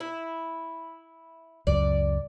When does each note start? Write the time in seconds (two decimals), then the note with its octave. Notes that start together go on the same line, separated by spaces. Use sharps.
0.01 E4
1.67 C#2 F#2 D5